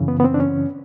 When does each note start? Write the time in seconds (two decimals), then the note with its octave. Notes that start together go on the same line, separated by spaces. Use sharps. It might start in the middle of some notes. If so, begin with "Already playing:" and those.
Already playing: F#2 C#3 E3
0.08 B3
0.20 B3
0.24 C4
0.34 D4
0.40 C#4